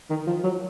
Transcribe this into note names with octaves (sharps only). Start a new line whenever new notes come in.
D#3
F3
F#3